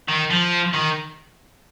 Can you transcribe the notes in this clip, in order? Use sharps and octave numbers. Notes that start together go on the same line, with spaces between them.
D#3
F3
D#3